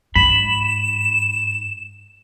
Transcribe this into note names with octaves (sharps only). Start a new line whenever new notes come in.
G#2 B5 E7